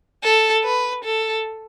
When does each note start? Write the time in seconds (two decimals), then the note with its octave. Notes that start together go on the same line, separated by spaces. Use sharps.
0.24 A4
0.64 B4
1.04 A4